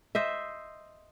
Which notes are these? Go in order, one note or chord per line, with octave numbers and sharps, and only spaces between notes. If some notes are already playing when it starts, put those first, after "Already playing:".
C5 D#5 E5